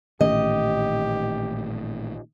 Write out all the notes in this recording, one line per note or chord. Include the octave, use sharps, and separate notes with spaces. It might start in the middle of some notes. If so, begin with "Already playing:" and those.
A1 A#2 D#3 A3 C#4 G4 D#5